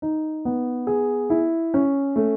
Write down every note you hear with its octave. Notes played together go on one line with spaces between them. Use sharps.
D#4
B3
G#4
E4
C#4
A3